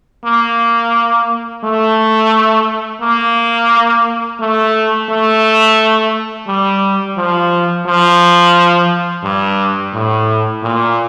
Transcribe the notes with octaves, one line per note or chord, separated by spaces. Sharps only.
A#3
A3
A#3
A3
A3
G3
F3
F3
G2
A2
A#2